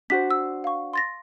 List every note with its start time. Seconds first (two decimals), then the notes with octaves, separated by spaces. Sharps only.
0.10 D4 F#4 C5 B6
0.31 E6
0.64 F5 C#6
0.93 C6 A6 A#6